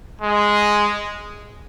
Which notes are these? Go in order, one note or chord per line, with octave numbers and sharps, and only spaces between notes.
G#3